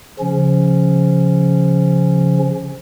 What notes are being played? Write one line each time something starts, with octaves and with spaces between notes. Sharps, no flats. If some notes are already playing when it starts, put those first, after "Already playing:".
C#3 F3 C#4